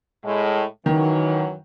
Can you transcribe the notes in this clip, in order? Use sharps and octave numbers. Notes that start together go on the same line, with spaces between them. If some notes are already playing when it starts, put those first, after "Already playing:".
A2 G#3
F#2 D#3 E3 F#3